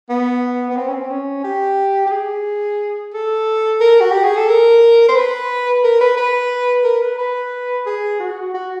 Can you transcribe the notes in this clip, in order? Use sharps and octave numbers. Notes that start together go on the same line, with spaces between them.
B3
B3
C4
C#4
C4
C#4
G4
G4
G#4
A4
A#4
F#4
G4
G#4
A4
A#4
C5
B4
A#4
B4
B4
A#4
B4
B4
G#4
F#4
F#4